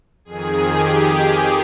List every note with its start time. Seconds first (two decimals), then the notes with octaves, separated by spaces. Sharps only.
0.25 F2 D#3 G#4
0.67 G4